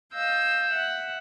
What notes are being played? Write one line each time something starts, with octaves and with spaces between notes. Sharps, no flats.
D#5 F5 E6 G6
E5 F#5